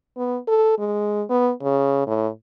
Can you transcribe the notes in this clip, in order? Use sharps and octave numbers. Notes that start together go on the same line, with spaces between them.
B3
A4
G#3
B3
C#3
A2